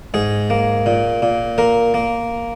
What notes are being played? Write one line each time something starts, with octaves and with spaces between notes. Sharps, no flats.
G#2 G#4
A#3
A#2
A#2
A#3 A#4
A#3